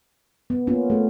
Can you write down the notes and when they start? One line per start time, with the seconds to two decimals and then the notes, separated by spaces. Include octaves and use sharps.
0.50 B3
0.67 A#3 B3 C#4 F4
0.90 A3 G#4